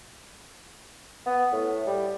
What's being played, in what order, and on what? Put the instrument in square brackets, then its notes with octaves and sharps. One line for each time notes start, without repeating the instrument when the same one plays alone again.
[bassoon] B3
A2
G3